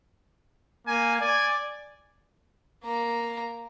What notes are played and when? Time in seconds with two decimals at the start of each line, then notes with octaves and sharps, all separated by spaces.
0.87 A#3 G#5
1.21 D5 G#5
2.84 A#3 A#5